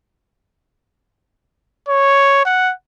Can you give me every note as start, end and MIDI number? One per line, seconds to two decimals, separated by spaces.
1.89 2.45 73
2.45 2.72 78